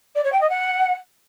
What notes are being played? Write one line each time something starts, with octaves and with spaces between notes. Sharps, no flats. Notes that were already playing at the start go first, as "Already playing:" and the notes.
D5
C#5
G5
D#5
F#5